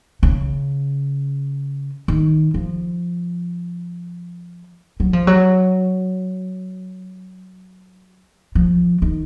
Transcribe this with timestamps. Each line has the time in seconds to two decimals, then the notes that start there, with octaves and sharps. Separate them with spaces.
0.23 C#3
2.08 D#3
2.54 F3
5.00 F#3
5.13 F3
5.27 F#3
8.55 F3
9.02 D#3